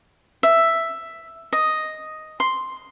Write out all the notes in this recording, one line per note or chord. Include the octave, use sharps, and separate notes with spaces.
E5
D#5
C6